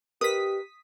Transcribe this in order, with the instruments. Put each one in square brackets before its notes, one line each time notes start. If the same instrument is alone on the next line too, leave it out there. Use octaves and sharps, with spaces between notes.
[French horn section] G4 [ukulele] A#4 B4 D#5 [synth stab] D#6 B6